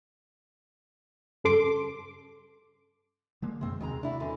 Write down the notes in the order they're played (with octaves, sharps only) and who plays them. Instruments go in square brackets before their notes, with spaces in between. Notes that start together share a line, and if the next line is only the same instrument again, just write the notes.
[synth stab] G2 C#3 A4 C6 D6
[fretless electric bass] D3 G#3 A#3
[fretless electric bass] F#2 B2 D#3 [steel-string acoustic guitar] G#3 C4
[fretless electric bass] D#2 C3 [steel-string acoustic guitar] D#3 G#3 A#5
[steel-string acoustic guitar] D4 E4 F#4
G#2 D3 E3